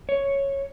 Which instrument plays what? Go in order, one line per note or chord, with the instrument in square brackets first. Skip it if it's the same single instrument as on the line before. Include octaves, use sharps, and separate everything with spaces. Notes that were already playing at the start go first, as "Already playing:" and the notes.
[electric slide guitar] C#5